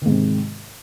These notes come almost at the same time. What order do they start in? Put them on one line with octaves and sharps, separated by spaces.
D#3 G#2 C3